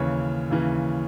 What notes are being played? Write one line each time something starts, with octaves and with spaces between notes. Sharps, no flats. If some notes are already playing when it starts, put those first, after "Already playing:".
Already playing: D#2 C#3 E3 C#5
D#2 C#3 E3